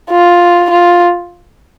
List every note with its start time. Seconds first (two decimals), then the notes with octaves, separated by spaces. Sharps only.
0.10 F4
0.71 F4